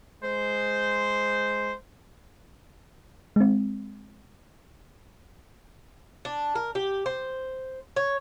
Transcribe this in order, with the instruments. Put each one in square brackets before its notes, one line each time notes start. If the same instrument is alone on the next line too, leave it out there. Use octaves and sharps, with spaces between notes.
[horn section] G#3 C5
[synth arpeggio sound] G#3 C4
[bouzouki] D4
A#4
G4
C5
C#5